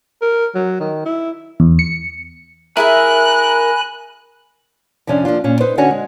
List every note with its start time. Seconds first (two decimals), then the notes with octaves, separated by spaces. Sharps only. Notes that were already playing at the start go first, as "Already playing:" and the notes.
0.22 A#4
0.55 F#3
0.80 D#3
1.05 E4
1.60 E2
1.79 C#7
2.77 E4 G#4 A#4 E5 G#5 B5 F#6
5.07 F2 C3 F3 C#4 D4 F4
5.25 F3 A#3 D4 F4
5.44 A#2 C#4
5.61 D#4 B4 C5
5.78 D3 C#4 D4 F#4 C#5 G#5
5.91 G#3